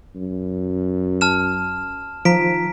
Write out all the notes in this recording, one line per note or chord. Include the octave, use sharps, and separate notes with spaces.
F#2
A5 F6 E7
D#3 F3 A#5 B6 D7